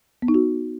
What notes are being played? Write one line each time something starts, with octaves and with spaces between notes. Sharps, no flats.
B3
D#4
F#4